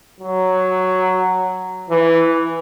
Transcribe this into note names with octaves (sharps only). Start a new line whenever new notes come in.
F#3
E3